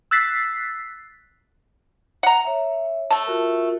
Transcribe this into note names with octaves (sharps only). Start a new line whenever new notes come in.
E6 F#6 A6 B6 C7
F#5 A#5
C#5 E5
A3 A5
F4 F#4 A#4